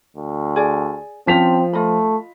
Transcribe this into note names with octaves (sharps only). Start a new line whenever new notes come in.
D2
G#4 D5
F3 C4 C#4 C5 A5 B6 F7
A3 F4 D#5 B5